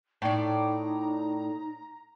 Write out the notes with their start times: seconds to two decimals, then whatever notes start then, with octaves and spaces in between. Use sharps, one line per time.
0.22 A2 D#4 D5 A#5